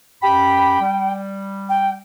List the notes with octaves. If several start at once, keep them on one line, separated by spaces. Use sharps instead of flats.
F#2 G4 G5 B5
G3
G5